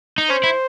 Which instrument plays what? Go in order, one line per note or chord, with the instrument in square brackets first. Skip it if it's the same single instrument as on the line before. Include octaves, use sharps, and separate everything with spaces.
[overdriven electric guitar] D#4
[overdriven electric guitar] C#4 [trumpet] C5
[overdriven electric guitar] E4